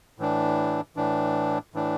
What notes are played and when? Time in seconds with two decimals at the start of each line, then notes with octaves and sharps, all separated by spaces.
0.19 A2 E3 D4
0.96 A2 E3 D4
1.74 A2 E3 D4